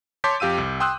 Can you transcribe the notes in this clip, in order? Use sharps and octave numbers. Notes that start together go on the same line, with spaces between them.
C#5 A5 C6 D6 G6 B6
F2 G4 F5 E6 D#7
C2
G5 C6 D#6 E6 F#6